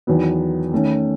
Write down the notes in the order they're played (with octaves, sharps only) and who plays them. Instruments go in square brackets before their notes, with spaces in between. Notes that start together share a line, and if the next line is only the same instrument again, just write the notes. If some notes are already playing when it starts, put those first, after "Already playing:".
[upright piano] E2 D#3 F#3 B3
D#3 A3 C#4